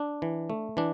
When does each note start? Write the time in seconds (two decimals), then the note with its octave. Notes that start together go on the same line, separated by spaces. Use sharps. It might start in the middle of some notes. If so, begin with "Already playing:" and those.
Already playing: D4
0.22 E3
0.50 A3
0.77 E3 D4